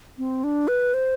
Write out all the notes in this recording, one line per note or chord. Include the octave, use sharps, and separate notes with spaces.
C4
D4
B4
C5